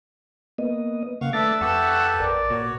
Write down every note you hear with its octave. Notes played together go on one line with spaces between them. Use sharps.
A#3 B3 D#5
C#3 A#3 F5 F#5 C#6
A3 D4 B4 E5 D6 A6
F2 G4 A4 B4 F#5 C#6 E6
A1 A#4 D5
A#2 F#4 C#5